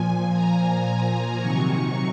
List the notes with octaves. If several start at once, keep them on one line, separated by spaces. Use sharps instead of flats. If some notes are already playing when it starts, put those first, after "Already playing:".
Already playing: A#2 F3 G#5
A#5
C3 D#3 F#3 C#6